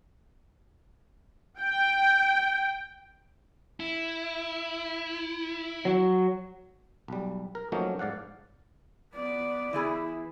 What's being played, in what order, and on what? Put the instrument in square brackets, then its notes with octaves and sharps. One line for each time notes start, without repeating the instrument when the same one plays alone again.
[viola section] G5
[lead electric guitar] E4
[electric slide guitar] F#3
[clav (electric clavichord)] B1 G3
A#4
F3 F#3 A3 A#3 C#4 D#4
G#2 D5 F5 F#5
[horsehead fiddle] B3 D5
[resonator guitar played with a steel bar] E3 B3 G#4 [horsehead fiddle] E4